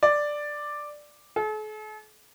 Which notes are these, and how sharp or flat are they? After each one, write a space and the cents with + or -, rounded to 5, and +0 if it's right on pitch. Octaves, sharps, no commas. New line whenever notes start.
D5 +5
A4 -45